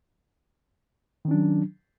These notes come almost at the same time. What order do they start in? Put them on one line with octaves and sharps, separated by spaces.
D#3 C#4 D4 F#3